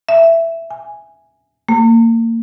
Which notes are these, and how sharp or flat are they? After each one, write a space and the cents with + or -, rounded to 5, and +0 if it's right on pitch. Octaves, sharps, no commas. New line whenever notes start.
E5 +10
G#5 -5
A#3 -30